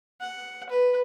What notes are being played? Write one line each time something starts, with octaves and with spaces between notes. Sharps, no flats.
F#5
B4